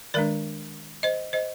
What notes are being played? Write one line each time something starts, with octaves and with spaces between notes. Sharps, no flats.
D#3 G#3 D4 A#4 D5
C5 D#5
C5 D#5